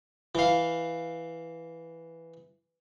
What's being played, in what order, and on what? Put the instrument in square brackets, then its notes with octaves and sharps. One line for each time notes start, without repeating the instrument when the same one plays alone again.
[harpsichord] E3 F5